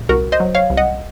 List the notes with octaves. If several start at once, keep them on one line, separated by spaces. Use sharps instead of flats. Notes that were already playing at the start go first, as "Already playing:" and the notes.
Already playing: A#2
C2 F#4 A#4
C5 D#5
F#3
C#5 F5
C2
D#5 F#5